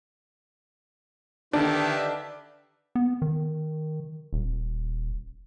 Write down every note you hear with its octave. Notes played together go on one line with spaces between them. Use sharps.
D3 D#3 D4 G4 B4 E5
B3
D#3
D#1